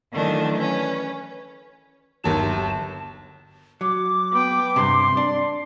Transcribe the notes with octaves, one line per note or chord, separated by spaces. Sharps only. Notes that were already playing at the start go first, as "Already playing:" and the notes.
D#3 E3 F#3 A3 D4 D#4
C#4 B4
G1 D#2 F#3 A5
F#3 D6
B3 G5
G2 C3 C6
D4